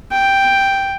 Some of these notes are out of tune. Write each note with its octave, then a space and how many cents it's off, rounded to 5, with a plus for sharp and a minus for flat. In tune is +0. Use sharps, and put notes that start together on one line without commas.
G5 +0